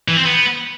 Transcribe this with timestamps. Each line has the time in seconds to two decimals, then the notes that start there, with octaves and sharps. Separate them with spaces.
0.08 E3
0.17 C4
0.25 B3